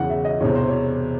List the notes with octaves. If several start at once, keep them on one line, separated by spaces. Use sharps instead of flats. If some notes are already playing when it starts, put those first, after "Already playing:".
Already playing: E1 E2 C#3 F#5
E5
D#5
E1 E2 C3 C#5
C5
C#5